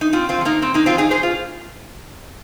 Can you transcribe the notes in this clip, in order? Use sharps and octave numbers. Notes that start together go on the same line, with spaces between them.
D#4
A#2 C4 F4
C4 F4
G#3
F3
A#3 D#4
A#2 C4
A#3 D#4
F3 G#3 C4 F4
D#4 G#4
A#2 G#4 C5
F4